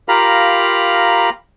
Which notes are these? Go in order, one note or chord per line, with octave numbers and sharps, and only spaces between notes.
F4 G4 A#4 F5 A#5 B5